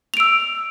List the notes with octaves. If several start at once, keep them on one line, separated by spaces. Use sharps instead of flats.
E6 D7 F7